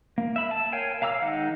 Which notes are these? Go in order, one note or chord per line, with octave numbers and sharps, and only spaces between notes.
A#3
E5 B5
A5
A#4 C#5 F5 G5 G#5
F5 A#5 D6 E6
D#3 G#3 D#4 F#5